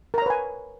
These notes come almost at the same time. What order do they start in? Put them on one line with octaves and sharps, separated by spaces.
A#4 A#5 C#5 B4 G#5